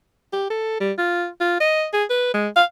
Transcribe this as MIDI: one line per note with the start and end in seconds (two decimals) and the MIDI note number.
0.33 0.47 67
0.50 0.80 69
0.81 0.92 55
0.98 1.27 65
1.40 1.59 65
1.60 1.86 75
1.93 2.04 68
2.10 2.34 71
2.34 2.48 56
2.56 2.64 77